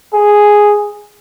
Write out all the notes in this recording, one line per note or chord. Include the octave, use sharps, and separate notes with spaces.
G#4